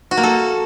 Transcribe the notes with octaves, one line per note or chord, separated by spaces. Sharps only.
F#4
A#3
A4